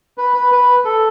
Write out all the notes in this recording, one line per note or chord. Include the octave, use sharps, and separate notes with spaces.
B4
B4
B4
A4